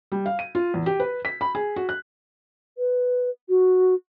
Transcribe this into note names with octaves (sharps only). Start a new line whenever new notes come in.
G3
F5
D#7
F4
E2
G4
B4
B6
B5
G#4
F#4
F#6
B4
F#4